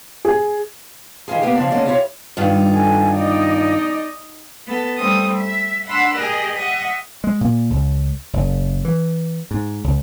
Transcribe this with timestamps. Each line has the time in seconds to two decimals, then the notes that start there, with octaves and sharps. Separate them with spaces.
0.25 G#4
1.28 D#3 E3 E4 F4 G#4
1.42 A#3 B3 G4
1.55 C#3 F3 D4
1.70 D3 G#3 A#3 C#4 D4
1.86 E4 F4 G4 B4 C#5
2.37 G2 D#3 F4
2.69 A4 G#5
3.14 D#4 D5 D#5
4.66 B3 A4
4.97 G3 A3 C4 D#6
5.37 E5
5.86 D4 F#5 B5 C6 E6 F#6
6.15 G4 G#4 A#4 D#5
6.56 D#5 E5 F#5 C#6 D#6
7.24 G#3
7.41 A#2
7.70 C#2
8.33 F#1
8.85 E3
9.51 G#2
9.84 C#2